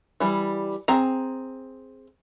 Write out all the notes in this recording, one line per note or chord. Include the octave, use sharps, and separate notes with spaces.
E3 G3
C4 G#4 A#5